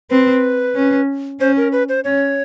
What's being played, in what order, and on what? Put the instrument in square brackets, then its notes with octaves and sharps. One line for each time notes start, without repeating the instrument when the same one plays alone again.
[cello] C4 [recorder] B4
[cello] C#4
[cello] C#4 [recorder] C5
[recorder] A#4
B4
C5
[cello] C#4 [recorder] C#5